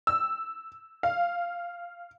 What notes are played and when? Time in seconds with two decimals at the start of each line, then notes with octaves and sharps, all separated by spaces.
0.07 E6
1.03 F5